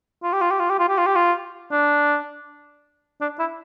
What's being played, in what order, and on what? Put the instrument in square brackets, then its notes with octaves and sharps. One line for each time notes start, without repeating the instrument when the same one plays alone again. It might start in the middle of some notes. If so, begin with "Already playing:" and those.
[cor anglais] F4
G4
F4
G4
F4
G4
F4
G4
F4
G4
F4
D4
D4
E4